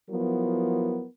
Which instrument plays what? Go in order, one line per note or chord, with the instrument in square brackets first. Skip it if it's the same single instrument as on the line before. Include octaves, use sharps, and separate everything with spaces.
[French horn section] F3 F#3 B3 E4 A#4